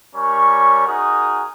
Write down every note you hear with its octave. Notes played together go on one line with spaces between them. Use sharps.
G3 C#4 A#4 C#5 C#6
D#4 F#4 G#4 A#4